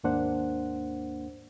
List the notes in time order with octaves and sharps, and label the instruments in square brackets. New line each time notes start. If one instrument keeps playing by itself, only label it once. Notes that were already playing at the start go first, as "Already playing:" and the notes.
[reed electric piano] D#2 G#2 A#3 D4 C5 F#5